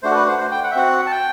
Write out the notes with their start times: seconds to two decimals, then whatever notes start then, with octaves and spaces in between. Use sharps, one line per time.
0.03 A3 D4 F#4 C5
0.11 A4
0.15 B4
0.27 C5
0.38 C5
0.51 G5
0.64 F#5
0.71 E5
0.75 C4 F#4 F#5
1.07 A5
1.11 G5